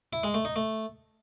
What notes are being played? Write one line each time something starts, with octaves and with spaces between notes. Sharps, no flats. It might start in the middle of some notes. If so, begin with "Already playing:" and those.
E4
G#3
A3
D#4
A3